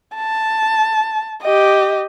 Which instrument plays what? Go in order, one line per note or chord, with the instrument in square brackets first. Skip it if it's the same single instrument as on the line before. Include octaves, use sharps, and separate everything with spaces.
[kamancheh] A5
G4 D#5